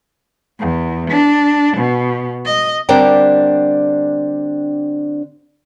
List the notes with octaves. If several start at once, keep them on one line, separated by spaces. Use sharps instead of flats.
E2
D4
B2
D#5
D3 G3 C4 D4 A#4 G5